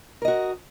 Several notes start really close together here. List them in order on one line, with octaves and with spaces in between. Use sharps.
A#4 D#5 F#4